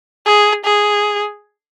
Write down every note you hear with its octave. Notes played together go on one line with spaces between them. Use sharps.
G#4
G#4